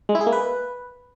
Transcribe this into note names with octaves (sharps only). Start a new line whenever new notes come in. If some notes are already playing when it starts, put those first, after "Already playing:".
G#3
E4
G#4
A#3
B4